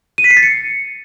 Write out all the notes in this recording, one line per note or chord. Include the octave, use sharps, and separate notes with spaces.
D#7
B6
C7
A6
C#7